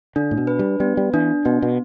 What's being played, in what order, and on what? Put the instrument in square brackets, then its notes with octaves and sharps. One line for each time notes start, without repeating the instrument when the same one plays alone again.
[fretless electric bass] D3 [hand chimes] D4
[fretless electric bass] A2
B2
[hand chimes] B4
[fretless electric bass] G3
[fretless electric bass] G3 [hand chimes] B3
[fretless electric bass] G3
[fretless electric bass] E3 [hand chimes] D4
[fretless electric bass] B2 [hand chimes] B3
[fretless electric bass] B2